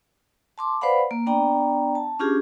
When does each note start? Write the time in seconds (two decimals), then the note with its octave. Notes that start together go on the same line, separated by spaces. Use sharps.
0.58 A5 C6 D6
0.81 B4 C5 D5 F5 F#5 B5
1.11 A#3
1.26 B3 D4 D5 G5 A#5
1.95 A5
2.19 C#4 D4 F4 G4 G#4